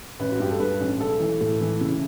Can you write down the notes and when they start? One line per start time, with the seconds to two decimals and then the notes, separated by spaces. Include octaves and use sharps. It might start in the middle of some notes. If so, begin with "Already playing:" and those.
0.20 A1 B4
0.32 F#4
0.40 G2 G4
0.50 A4
0.60 G2 B4
0.80 A1
1.00 B1 A4
1.20 E3
1.41 A2
1.61 E3
1.81 C#3